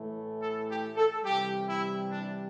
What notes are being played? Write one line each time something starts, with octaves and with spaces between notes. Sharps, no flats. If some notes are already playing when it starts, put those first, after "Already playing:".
Already playing: A2 E3 A3
A4
G4
A4
C3 E3 G3 G4
E4
D4